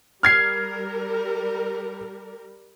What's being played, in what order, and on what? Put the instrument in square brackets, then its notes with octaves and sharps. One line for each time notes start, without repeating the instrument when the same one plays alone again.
[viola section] G3 A#4 [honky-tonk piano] F6 G#6 C7